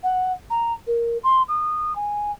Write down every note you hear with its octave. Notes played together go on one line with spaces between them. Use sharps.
F#5
A#5
A#4
C6
D#6
G#5